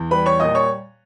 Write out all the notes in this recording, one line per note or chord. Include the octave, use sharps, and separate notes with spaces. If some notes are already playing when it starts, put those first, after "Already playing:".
Already playing: E2
G3 B4 B5
C#5 C#6
A#2 D#5 D#6
C#5 C#6